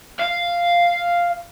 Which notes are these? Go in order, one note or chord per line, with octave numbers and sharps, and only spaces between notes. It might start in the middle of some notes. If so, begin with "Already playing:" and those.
F5